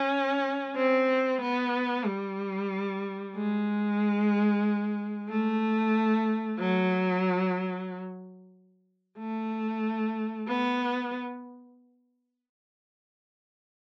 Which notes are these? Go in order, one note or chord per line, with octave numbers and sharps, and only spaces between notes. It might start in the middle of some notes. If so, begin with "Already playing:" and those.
Already playing: C#4
C4
B3
G3
G#3
A3
F#3
A3
B3